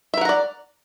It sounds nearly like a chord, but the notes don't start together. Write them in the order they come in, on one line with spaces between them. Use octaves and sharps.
E5 A#4 F#5 A#5 D5